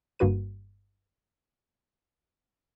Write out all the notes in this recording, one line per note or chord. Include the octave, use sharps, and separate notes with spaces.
G1 G2 A#3 F#4 B4 D#7